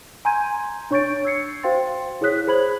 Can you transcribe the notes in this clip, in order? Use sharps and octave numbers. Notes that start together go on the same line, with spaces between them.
G#5 A#5 C6 G6 G#6 D#7
D4 C#5 C#6 G6 A6 D7
E6 G#6 C7 C#7
F#4 C5 F5 G5 C6 A6
E4 G#4 C#5 D#6 F#6 B6
G#4 C5 B5 G#6 F#7